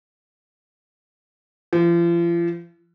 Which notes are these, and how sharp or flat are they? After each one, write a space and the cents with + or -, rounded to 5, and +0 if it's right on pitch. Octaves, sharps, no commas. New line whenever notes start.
F3 -40